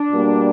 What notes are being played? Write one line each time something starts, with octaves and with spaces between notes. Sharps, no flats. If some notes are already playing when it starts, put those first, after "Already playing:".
Already playing: D4
B2 G3 A#3